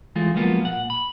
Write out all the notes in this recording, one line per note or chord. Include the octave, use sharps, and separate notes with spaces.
E3 G#3 A3 F4
F3 F#3 G#3 A#3 B3 F4
A#2 F#5
B5